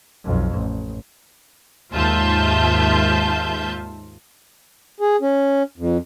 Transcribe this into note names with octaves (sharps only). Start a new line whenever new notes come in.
B1 F2
A1
D#2 G#2 F4 E5 A5 G6
G#4
C#4
F2